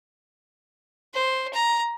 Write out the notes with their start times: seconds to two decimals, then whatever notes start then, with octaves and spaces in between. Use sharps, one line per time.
1.14 C5
1.53 A#5